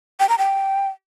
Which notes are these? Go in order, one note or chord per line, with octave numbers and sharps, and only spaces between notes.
G5
A#5
G5